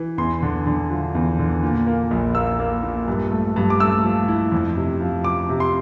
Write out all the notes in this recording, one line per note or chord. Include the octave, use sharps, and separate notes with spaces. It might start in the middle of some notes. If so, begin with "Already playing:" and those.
Already playing: E3
E2 C6
D3
D3
F3
E2
D3
A#2
A#3
A#1
A#3 E6
A#3
A#2
G2
A3
G2
D6
A3 E6
F3
E4
F2
C3
F3
F3 D6
C3
C6